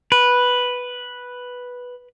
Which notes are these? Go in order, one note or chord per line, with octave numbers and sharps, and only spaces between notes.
B4